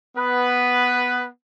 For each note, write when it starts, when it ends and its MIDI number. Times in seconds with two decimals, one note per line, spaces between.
0.17 1.28 59
0.17 1.28 71